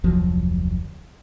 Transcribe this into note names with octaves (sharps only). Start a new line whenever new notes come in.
F1 D2 F3 F#3